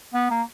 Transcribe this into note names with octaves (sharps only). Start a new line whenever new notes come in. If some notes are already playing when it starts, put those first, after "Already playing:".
B3
A#3